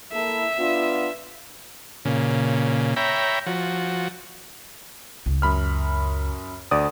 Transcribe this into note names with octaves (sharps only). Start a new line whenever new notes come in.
A#3 E4 A4 E5
B3 D4 F4
A#2 C#3
C#5 E5 G5 A#5 B5
F3 F#4
C#2
F#2 B5 F6
D2 D5 D#6